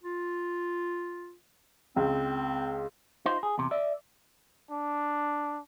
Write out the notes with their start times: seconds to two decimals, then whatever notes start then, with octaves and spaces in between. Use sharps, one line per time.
0.03 F4
1.96 C#2 C4
3.26 D#4 F4 C5
3.43 G#4
3.58 E2 C3
3.71 D5 E5
4.71 D4